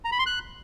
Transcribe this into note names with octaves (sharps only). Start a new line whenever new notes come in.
A#5
B5
C6
F#6